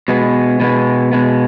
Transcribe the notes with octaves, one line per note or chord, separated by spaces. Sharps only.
B2 G#3 B3
B2 G#3 B3
B2 G#3 B3